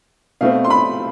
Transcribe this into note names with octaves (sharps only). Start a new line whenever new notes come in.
B2 A3 C4 F5
C6
B5